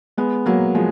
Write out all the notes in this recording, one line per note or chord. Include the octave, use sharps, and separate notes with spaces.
G#3 B3
F#3 A#3
F3 G#3